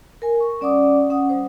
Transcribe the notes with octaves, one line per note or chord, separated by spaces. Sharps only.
A#4 G#5
C#6
G3 C#4 D5 F#5 D6 D#6
C#4 F#5 D#6
G3 C5